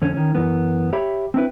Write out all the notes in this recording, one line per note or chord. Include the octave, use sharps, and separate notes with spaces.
F2 D3 C#4
D#3 C#4
F#2 E3 B3
G4 C#5 E5 B5
C4 D4 E4 B4